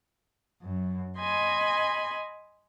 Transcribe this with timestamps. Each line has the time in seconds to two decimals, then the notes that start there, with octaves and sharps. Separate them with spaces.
0.62 F#2
1.18 D#5 G#5 B5 C6